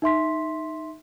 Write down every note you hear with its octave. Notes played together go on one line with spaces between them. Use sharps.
D#4 E5 C6 B6